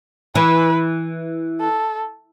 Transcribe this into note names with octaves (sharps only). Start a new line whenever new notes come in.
E3 B4
A4